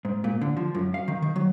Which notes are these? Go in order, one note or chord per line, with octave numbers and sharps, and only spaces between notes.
G#2
A#2
D3
F3
F#2
F5
D#3
D#3
F#3